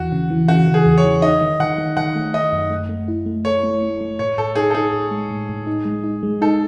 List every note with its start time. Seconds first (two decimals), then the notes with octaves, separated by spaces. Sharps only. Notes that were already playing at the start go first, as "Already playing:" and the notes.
Already playing: E2 E3 F#4
0.12 C#3
0.30 E3
0.48 C#3 F#4
0.68 E3
0.74 G#4
0.86 E2
0.98 C#5
1.04 E3
1.22 D#4 D#5
1.42 D#3
1.60 D#3 F#5
1.78 D#3
1.97 D#3 F#5
2.15 A3
2.34 D#3 D#5
2.53 F#2
2.70 A3
2.89 A3
3.08 E4
3.26 A3
3.45 A4 C#5
3.63 A3
3.83 A3
4.01 A3
4.19 A2 C#5
4.38 A2 A4
4.56 D#4 G#4
4.70 A4
4.75 D#4 G#4
4.93 A2
5.11 G#3
5.31 A2
5.49 A2
5.67 D#4
5.85 G#3
6.04 D#4
6.23 G#3
6.41 D#4 A4